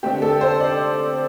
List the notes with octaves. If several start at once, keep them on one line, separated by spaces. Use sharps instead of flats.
D3 A3 C4 G4
A4
C5
D5